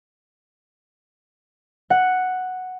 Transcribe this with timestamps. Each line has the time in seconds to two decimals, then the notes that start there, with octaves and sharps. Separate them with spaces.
1.90 F#5